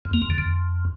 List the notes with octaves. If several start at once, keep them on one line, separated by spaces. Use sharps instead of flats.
F2
A#3
F2
D3
F2